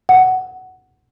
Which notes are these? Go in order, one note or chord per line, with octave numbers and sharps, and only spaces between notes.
F#5